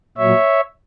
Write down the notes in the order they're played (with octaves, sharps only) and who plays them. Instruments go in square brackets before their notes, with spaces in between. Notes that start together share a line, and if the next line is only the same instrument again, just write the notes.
[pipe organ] A#2 F#3 C#5 E5